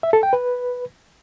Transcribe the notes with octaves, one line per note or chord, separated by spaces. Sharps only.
E5
A4
G5
B4